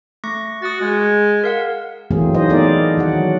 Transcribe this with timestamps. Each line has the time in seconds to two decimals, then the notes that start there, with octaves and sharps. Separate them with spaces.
0.24 A3 C#6 A#6
0.62 F#4 D#6 A6
0.81 G#3 G#4
1.44 A#4 F5 F#5
2.11 E3 F#3 A3 A#3 C4 G#4
2.34 D#4 C5 D#5
2.49 A3 B3 D#4 G#4 A#4 D5
2.97 D#3 F#3 F#5